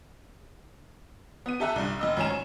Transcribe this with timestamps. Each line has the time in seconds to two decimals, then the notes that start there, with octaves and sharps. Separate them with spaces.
1.46 B3 D#7
1.60 G4 A4 E5 A5 A#5 F#6
1.76 C2 G2
1.99 F1 D#5 E6
2.17 G#1 F#3 C#4 G#5 A#5 E7
2.30 C#5